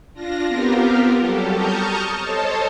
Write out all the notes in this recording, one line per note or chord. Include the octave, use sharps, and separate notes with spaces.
D4 F4 A#6
B3 C4 F4 G4 A#4
F#3 G3 G4 A4
A5 A#5 C#6 D#6 F6 G6
A4 C5 C#5 D#5 A5